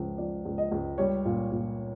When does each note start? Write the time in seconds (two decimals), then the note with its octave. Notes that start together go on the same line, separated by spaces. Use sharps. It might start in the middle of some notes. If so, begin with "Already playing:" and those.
Already playing: C#2 F3
0.18 F3 D5
0.45 C#2
0.58 D#5
0.72 C#2
0.98 G3 C#5
1.25 A#2
1.52 A#2